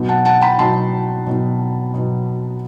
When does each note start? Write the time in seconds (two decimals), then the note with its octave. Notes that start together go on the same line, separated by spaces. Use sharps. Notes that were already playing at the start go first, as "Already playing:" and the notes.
Already playing: B2 F#3 B3 D#4
0.08 F#5 A5
0.25 F#5 A5
0.41 G5 B5
0.58 B2 F#3 B3 D#4 A5 C6
1.26 B2 F#3 B3 D#4
1.94 B2 F#3 B3 D#4